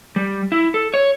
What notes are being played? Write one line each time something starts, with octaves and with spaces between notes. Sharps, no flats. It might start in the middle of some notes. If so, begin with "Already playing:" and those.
G3
E4
A4
C#5